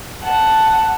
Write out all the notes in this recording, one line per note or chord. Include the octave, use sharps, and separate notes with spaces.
F#5 A5